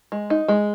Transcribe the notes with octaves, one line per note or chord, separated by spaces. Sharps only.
G#3
D#4
G#3